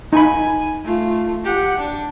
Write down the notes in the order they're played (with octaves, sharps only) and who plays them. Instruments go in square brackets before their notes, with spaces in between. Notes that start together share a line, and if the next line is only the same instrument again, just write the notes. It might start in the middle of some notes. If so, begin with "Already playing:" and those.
[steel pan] D#4 B5 [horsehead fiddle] G#5
[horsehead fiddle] A3 F4
G4 F#5
D4